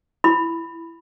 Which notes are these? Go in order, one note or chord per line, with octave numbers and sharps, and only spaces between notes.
E4 B5